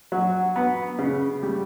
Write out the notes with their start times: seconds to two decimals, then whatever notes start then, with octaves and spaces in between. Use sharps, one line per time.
0.12 F#3
0.56 B3
0.99 C#3
1.43 G3